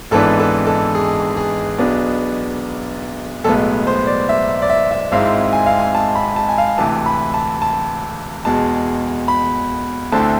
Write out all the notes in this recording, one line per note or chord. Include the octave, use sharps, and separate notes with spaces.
G#1 G#2 E3 B3 D4 A4
A4
A4
G#4
G#4
B1 B2 B3 D4
B1 A2 G#3 B3 A4
C5
D5
E5
D5
E5
E5
G#1 G#2 G#3 C4 E4 F5
G#5
F5
G#5
A5
B5
A5
G#5
F5
D2 C3 E3 A5
B5
A5
A5
E2 B2 G#3 A5
B5
D2 D3 A3 C4 E4 A5